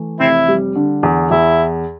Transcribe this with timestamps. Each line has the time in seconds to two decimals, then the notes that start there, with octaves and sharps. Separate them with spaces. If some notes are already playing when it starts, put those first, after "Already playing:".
Already playing: E3 A3
0.20 F1 C4 E4
0.48 G3
0.76 D3
1.03 E2
1.31 E2 E4